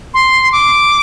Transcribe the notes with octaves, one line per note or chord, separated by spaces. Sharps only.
C6
D6